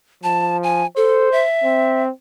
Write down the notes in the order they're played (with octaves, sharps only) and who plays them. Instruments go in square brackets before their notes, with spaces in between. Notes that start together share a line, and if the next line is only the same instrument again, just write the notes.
[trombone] F3 [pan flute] A5
[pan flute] G#5
[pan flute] A4 [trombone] C5
[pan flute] E5
[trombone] C4